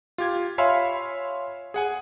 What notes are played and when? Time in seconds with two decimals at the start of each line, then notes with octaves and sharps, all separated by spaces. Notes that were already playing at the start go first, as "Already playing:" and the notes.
0.18 F4 G4 G#6
0.58 C#5 E5 F5 G#5 B5 C6
1.74 G#4 F#5 G#5